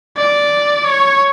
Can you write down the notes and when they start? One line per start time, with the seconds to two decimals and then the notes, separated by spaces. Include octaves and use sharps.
0.17 D5
0.85 C#5